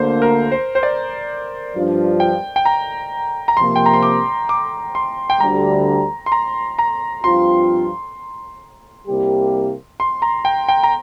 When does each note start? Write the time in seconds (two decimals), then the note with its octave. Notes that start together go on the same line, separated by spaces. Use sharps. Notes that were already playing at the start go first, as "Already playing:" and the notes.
Already playing: D2 D3 A#3 C5
0.22 A#4
0.51 C5
0.75 C5
0.83 D5
1.73 G2 F3 D4 F4
2.20 G5
2.56 G5
2.65 A#5
3.48 A#5
3.57 C3 F3 A#3 C6
3.76 G5
3.86 A#5
3.94 C6
4.03 D6
4.49 D6
4.95 C6
5.30 G5
5.40 D2 D3 G3 A#5
6.26 C6
6.32 A#5
6.79 A#5
7.24 G2 F3 C4 F4 C6
9.07 C2 C3 G3 A#3 G4
10.00 C6
10.22 A#5
10.45 G5
10.68 G5
10.83 A#5